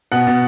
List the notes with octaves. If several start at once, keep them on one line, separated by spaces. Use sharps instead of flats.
B2 F#5
B2